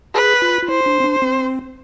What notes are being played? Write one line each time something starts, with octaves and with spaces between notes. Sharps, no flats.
G#4 B4
F4
F4
E4 C5
D4
C4
D4
C4